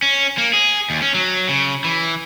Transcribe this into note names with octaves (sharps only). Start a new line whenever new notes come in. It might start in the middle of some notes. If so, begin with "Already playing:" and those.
C#4
A#3
G#4
D#2
C#4
F#3
C#3
E3